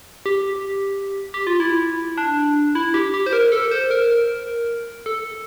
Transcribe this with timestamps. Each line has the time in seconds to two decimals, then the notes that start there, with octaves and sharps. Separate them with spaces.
0.26 G4
1.34 G4
1.47 F4
1.60 E4
2.18 D4
2.75 E4
2.94 G4
3.14 G4
3.26 C5
3.33 A#4
3.52 A4
3.71 C5
3.91 A#4
5.06 A4